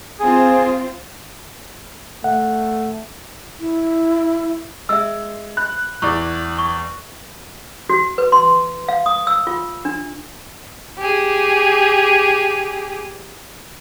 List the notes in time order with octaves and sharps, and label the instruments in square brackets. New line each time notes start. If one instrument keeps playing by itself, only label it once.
[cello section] C4 F4 [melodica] G#4
[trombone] A3 [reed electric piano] F#5
[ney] E4
[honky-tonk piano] G#3 [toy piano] E5 E6
[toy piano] B5 [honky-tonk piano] F#6
[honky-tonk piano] E2 D5 [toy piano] C#6
[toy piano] C#6
F#4
B4
C6
F5
D#6
E6
F4
D4
[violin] G4 G#4